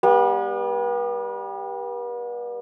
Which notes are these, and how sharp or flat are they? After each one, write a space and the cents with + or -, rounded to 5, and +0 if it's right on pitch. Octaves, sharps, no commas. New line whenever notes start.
G3 +10 B3 -40